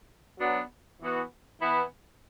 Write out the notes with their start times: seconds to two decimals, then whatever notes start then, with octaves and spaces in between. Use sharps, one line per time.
0.39 F#3 B3 D4
1.00 E3 B3 F#4
1.61 E3 B3 E4